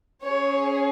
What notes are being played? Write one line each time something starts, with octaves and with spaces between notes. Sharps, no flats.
C#4 G#4 C#5